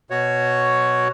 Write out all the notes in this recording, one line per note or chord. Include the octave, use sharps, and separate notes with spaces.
B2 F#4 C#5